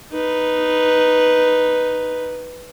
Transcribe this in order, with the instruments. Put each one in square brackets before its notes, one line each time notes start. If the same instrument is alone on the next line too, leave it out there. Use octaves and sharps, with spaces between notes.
[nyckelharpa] D#4 B4